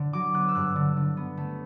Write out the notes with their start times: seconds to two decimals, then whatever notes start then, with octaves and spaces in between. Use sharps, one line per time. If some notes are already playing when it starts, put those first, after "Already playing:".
Already playing: D3
0.13 F#3 D6
0.34 B3 F#6
0.48 E6
0.55 G2 F#6
0.76 D3
0.97 D3
1.17 B3
1.37 A3